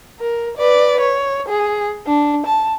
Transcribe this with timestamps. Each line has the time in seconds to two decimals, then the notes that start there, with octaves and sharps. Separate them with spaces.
0.20 A#4
0.57 B4 D5
1.00 C#5
1.48 G#4
2.07 D4
2.46 A5